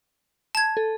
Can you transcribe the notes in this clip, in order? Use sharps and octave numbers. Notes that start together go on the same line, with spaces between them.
A5 G#6
A4